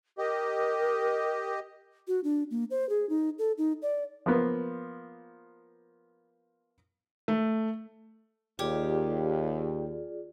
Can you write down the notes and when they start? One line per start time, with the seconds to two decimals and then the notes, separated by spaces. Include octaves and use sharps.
0.18 G4 A#4 D#5
2.08 F#4
2.24 D4
2.51 A#3
2.71 C5
2.89 G#4
3.10 D#4
3.39 A4
3.58 D#4
3.82 D5
4.26 F3 A#3 B3
7.28 A3
8.59 D#2 F4 G4 G#4 D5